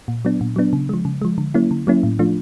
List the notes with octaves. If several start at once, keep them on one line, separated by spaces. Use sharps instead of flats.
A#2
F#3 B3 D4
A#2
F#3 B3 D4
C#3
F3 G#3
C#3
F3 G#3
D3
F#3 A#3 C#4 E4
D3
F#3 A#3 C#4 E4
A2
F3 A3 D4 F4